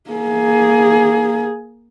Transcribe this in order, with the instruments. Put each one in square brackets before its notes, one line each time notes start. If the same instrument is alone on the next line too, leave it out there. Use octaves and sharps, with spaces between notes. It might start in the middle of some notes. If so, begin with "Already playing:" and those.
[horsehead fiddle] A#3 G#4